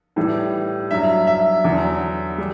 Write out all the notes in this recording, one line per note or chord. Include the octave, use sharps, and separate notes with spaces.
A2 E3 G3
G2 F#3 E5
E5
E2 D3 F#3
G3